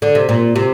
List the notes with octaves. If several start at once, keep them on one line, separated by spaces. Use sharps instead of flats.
D3
C3
A#2
C3